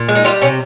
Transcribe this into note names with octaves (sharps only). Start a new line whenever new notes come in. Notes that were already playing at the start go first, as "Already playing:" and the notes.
Already playing: A#2
G#3
D#4
G3 F4
C3 C#4